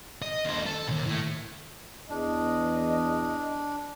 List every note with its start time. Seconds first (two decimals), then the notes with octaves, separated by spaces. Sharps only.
0.22 D#5
0.45 D#2 C5
0.66 A4
0.88 D#2 A#2
1.06 A2
2.10 E2 D4 D#5